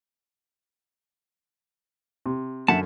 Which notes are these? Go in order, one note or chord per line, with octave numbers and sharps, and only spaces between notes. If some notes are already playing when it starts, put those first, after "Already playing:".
C3
F#2 D3 E5 F#5 A5